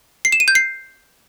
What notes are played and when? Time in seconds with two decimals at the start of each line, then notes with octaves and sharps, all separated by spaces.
0.25 C7
0.32 E7
0.40 D#7
0.48 G6
0.55 C7